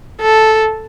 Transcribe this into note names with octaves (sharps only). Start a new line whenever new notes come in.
A4